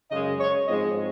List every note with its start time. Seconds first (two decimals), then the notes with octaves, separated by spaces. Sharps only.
0.11 F#2 C#3 G#3 D#5
0.40 C#5
0.67 G#2 F3 G#3 C4 D#5